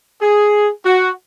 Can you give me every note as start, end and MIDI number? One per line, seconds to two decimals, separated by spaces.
0.22 0.69 68
0.85 1.11 66